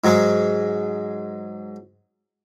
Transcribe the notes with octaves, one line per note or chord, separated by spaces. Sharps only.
G#2 F#3 G#3